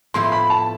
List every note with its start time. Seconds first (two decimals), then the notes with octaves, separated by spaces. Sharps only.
0.14 A2 F3 B3 E4 C6
0.32 B5
0.50 A5